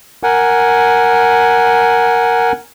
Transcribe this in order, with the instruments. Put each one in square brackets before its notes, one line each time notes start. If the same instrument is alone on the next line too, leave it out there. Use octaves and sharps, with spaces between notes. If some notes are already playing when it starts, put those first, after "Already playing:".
[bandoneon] A#4 F#5 G#5